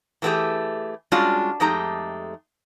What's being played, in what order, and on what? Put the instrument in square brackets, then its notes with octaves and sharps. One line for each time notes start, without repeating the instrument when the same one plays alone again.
[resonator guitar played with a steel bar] E3 G#3 A3 B3 G4 G#4
G3 G#3 C#4 D4 F4 F#4
F2 G#3 A3 D#4 G4 A#5